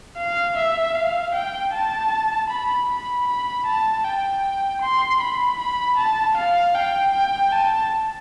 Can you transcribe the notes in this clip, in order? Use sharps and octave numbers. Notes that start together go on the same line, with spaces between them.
F5
E5
F5
G5
A5
B5
B5
B5
A5
G5
C6
B5
B5
A5
F5
G5
G5
A5